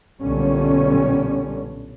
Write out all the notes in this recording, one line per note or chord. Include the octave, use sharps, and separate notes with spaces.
B1 A#2 D3 E3 G3 C#4